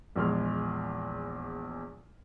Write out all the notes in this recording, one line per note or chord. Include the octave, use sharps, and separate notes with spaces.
A#1 E2 G#3 F6